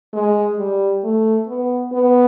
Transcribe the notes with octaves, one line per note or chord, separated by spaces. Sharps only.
G#3
G3
A3
B3
B3